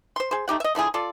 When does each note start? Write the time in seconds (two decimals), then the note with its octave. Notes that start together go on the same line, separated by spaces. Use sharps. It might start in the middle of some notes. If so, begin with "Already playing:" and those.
0.16 C5 C6
0.31 G#4 C5
0.48 A3 D#4 G4 F#5
0.60 D#5 E5
0.75 D3 F3 E4 G#4
0.94 F4 A4 D5